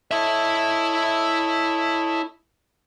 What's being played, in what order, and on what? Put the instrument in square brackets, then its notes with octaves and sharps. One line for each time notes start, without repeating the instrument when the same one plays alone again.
[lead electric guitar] E4 E5 [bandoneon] A4 C#5 D#5